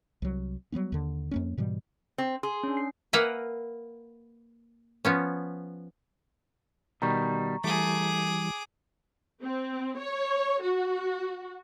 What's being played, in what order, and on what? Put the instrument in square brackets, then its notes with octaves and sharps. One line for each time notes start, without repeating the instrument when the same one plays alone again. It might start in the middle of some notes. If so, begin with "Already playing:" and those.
[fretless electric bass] C2 F#3
F#3 G3 B3 C#4
D#2 D3
F2 A#3 C#4
G#2 B2 E3 G3
[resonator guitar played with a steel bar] C4
[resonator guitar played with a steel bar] G#4 [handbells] C6
[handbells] C#4 D4
C7
[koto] A#3 A#4 B4 E5 F#5 G#5
F3 B3 C#4
[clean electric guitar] B2 D#3 G3 [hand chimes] A#5 C#6
[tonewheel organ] E3 G3 [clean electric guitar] A3 [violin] G#4 D6
[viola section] C4
C#5
F#4